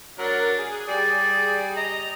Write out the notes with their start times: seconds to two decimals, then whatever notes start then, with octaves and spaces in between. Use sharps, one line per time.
0.18 F#3 D4 A#4 F#5
0.58 G#4
0.88 G3 D5
1.77 D#5 A#5